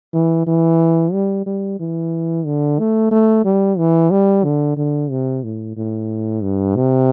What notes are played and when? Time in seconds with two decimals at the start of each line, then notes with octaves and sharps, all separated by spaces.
0.14 E3
0.47 E3
1.13 G3
1.46 G3
1.80 E3
2.46 D3
2.79 A3
3.12 A3
3.45 G3
3.78 E3
4.11 G3
4.44 D3
4.77 D3
5.11 C3
5.44 A2
5.77 A2
6.43 G2
6.76 C3